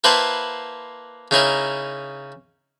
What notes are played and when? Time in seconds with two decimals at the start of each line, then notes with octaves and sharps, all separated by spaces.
0.04 A#3 E4 B4 C5 F#5 A5
1.31 C#3 D#4 E4 A#4